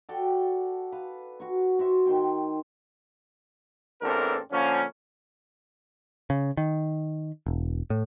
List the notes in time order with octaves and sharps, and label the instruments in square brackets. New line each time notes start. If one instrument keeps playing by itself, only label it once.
[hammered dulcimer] F#4 A4 D5 G5
B4 F5
F#4 C#6
F#4 C5 E5
D#3 C5 G5
[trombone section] A1 E2 C4 D4 A4 A#4
D3 F3 A#3 C#4
[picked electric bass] C#3
D#3
E1
A2